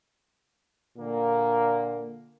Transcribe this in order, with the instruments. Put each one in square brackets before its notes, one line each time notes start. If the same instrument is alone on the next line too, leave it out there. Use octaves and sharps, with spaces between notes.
[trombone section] A#2 D3 A#3